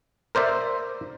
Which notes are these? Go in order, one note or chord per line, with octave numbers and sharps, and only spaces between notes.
A#4 C5 D5 E5